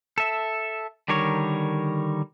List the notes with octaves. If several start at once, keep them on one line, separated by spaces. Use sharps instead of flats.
A4 E5
D3 D#3 G3 A#4 C#5